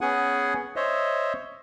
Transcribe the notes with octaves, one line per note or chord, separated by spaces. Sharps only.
B3 C#4 G#4 F#5 G#5
C5 C#5 D#5 E5